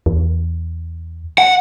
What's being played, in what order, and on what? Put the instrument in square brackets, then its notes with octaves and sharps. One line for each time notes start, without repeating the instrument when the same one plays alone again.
[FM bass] E2
[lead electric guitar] F#5